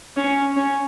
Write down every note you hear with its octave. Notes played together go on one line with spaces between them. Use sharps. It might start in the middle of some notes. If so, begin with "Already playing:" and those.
C#4
C#4